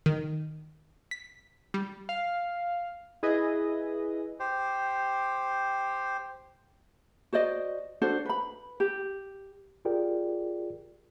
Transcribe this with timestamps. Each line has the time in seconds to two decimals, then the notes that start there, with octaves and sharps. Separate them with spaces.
0.06 D#3
1.11 B6
1.74 G3
2.09 F5
3.23 E4 G#4 B4 D#5
4.40 G4 C5
7.33 F#4 C5 D5 D#5
8.02 D4 F#4 A4 C5
8.25 B4 B5
8.80 G4
9.85 F4 G4 G#4 A#4 D5 G5